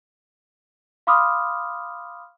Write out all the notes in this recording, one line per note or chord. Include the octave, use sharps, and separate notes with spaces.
F5 B5 C6 D6 D#6 F6